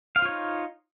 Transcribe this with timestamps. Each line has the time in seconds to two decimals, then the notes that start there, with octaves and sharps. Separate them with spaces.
0.16 F5
0.19 C5
0.22 F4
0.25 C#5
0.29 D#4